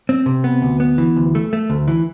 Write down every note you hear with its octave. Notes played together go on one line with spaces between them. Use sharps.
C4
C3
B3
D2
B3
E3
D2
A3
A3
D2
E3